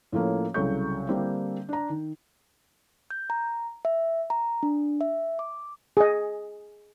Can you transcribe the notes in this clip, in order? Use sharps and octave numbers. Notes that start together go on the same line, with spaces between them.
A2 F3 A3 A#3 C#4
C2 C#3 F#3 A4 C#6 G6
D3 G3 A#3 C4 D4 E4
D4 A#5
D#3
G6
A#5
E5
A#5
D4
E5
D6
G#4 D#5